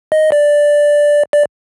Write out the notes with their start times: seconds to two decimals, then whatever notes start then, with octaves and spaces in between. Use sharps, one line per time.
0.12 D#5
0.32 D5
1.33 D5